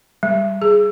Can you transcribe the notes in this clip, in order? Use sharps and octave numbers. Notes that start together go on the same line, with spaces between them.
G3
G#4